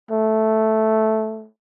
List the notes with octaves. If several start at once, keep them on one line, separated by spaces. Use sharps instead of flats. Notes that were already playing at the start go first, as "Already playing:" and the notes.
A3